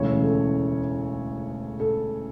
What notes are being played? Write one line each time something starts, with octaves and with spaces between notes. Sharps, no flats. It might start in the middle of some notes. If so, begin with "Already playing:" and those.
Already playing: E1 D2 C#3 E3 C#5
A4
A4